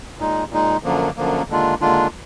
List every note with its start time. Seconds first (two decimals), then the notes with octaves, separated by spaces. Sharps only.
0.18 A#2 G#3 D#4
0.51 A#2 G#3 D#4
0.83 F#2 D3 F3 A#3
1.17 F#2 D3 F3 A#3
1.49 D#2 D3 G#3 D4 F4
1.81 D#2 D3 G#3 D4 F4